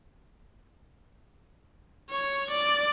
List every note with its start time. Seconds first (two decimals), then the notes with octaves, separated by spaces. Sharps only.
2.10 C#5
2.50 D5